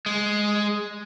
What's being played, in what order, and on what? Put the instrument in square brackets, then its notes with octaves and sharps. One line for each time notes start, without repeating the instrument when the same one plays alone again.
[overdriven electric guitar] G#3